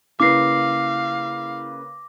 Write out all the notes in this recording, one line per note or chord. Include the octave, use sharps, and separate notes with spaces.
C#3 A#3 E4 B4 F5 D6 A#6 C7